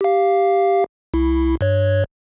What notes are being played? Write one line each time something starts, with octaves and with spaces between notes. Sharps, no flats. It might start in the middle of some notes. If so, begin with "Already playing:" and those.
G4 F5
C2 E4
G2 C#5